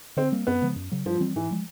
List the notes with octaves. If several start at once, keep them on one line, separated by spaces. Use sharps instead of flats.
D3 C4
G3 A#3
F#2 B3
C#3 F3 G#3
F#2
C#3 F#3
G2 F3
E3 G3 C4
G#2 E3
F3 G#3